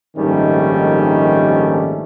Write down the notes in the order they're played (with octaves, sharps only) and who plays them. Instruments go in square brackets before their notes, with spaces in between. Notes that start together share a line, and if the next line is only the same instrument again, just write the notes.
[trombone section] A#1 G#2 D#3 G3 A3 C#4